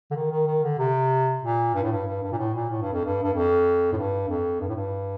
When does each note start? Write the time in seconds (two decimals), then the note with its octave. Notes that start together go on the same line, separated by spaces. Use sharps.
0.11 D3
0.15 D#3
0.31 D#3
0.46 D#3
0.63 D3
0.78 C3
1.42 A#2
1.74 G2
1.83 A2
1.91 G2
2.06 G2
2.22 G2
2.32 A#2
2.38 A2
2.54 A#2
2.70 A2
2.81 G2
2.92 F2
3.04 G2
3.23 G2
3.33 F2
3.92 A2
3.96 G2
4.28 F2
4.60 G2
4.68 A2
4.75 G2